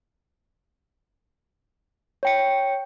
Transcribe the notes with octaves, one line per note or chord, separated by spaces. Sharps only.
C#5 G5 C#7